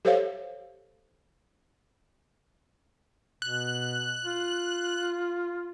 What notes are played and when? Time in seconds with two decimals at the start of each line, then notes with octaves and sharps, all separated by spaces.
0.05 G4 A4 C5 C#5 E5 F5
3.42 B2 F#6
4.25 F4